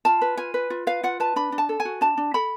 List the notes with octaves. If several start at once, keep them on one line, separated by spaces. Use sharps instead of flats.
F4 A5
B4
F4 G#5
B4
F4
B4 F5
F4 F#5
B4 A5
D4 B5
D4
A5
A4
G#5
F#4
D4 A5
D4
A4 B5